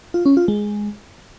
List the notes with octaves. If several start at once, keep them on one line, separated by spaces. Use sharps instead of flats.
F4
C#4
F4
G#3